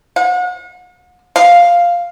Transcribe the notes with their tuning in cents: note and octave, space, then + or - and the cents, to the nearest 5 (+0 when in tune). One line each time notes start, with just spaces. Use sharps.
F#5 -40
F5 +0